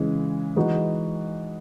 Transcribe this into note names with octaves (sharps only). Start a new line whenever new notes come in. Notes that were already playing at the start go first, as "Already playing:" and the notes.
Already playing: C#3 E3 G#3
E3 G#3 D#4 F#4 B4